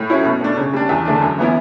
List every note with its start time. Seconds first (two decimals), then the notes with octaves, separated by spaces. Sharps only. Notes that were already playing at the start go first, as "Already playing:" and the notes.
Already playing: A2
0.10 F#3 C#4 E4
0.25 B2
0.41 A3 D4
0.57 C#3
0.73 G3 D4
0.89 E2
1.05 D3 A3 D4
1.21 F#2
1.38 E3 B3 E4